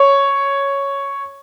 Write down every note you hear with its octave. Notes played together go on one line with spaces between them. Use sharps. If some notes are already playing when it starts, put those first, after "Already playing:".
Already playing: C#5